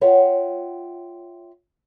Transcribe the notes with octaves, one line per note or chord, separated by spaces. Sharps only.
F4 C#5 E5 F#5 G5